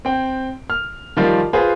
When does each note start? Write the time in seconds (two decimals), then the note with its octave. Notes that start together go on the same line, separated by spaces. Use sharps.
0.05 C4 G5
0.70 F6
1.17 D#3 F3 G3 F4
1.53 F4 G#4 B4 C5